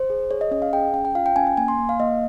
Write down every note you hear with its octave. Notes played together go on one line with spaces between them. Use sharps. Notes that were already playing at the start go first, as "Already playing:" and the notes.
Already playing: C5
G#4
G#4 C#5
D#5
C#4 D#5
F5
G#4 G5
C#4 G5
G5
F4 F5
G5
C#4 G#5
G#5
A#3 G#5
C6
A#3
F5
A#3 D#5